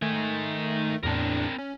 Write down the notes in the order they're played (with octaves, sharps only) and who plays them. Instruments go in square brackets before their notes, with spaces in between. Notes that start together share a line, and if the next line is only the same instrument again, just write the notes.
[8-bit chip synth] D#3 A3 [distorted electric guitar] D#4 G#5
[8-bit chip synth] E2 A2 D4 [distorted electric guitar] C4 A#4
[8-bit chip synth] C#4